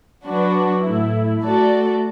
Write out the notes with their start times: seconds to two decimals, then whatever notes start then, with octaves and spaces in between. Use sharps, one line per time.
0.24 F#3 D4 F#4 B4
0.83 A2 A3 E4
1.42 A3 F#4 A4 D5